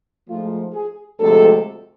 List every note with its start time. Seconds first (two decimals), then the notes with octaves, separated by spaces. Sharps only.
0.28 G#2 F3 A3 F4
0.73 G#4
1.19 D2 C3 F3 G#3 A4